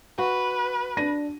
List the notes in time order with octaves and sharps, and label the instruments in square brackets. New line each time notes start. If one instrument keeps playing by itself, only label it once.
[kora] F#4 [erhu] B4
[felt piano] D4 A#6 D#7